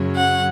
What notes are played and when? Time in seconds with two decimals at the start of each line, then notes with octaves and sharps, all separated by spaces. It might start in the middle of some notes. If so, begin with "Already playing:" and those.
Already playing: F#2 C#3 F#3 C#4
0.15 F#5